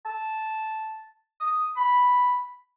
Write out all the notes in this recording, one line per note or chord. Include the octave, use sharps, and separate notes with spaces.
A5
D#6
B5